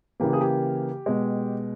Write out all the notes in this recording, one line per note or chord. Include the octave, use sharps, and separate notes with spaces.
C#3 E3 A#3 G4
G#4
G4
B2 G#3